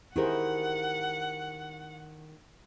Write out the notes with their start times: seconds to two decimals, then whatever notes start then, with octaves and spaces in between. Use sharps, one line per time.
0.16 D#3 E4 G4 G#4 A#4 C5 F#5